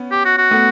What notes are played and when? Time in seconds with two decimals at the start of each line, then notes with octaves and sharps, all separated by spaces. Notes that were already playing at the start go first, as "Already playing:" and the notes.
Already playing: B3 C#4
0.12 G4
0.25 F#4
0.38 F#4
0.51 A3 B3